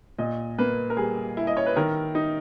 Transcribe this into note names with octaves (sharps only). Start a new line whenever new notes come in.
A#2 D#5
A#3 B4
A#4
G3 G#4
E4
D#5
C#5
B4
D#3 A#4
D#4